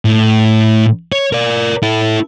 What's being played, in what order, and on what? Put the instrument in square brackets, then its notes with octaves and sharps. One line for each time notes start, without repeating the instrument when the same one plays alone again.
[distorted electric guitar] A2
C#5
A#4 D5
E4 A4